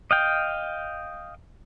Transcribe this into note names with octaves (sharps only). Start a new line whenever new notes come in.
D#5 F5 G5